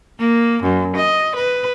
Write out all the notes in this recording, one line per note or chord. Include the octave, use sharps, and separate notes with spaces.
A#3
F#2
D#5
B4